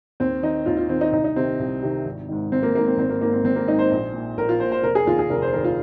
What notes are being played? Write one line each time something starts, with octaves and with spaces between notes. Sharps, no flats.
D#2 C4
D#3 D#4
D#2 F4
F4
D#3 C4
D#4
C2 D#4
D#4
C3 D#3 C4
C2
C3 D#3
G#1
G#2 D#3
G#1 C4
A#3
G#2 D#3 A#3
C4
G#1 C4
A#3
G#2 D#3 A#3
C4
G#1 C4
A#3
G#2 D#3 D#4
C5
A#1
A#2
A#1 A#4
F4
A#2 C5
C5
F1 A#4
G#4
D#2 D#3 F4
G#4
F1 A#4
C5
D#2 D#3 A#4
F4